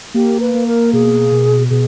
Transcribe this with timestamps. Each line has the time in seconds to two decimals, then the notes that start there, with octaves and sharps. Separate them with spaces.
0.14 A#3 G4
0.40 B4
0.54 A#3
0.67 A#4
0.93 B2 G#4
1.32 B2
1.70 B2 G#4